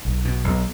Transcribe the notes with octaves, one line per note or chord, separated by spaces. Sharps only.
B1
B2
B1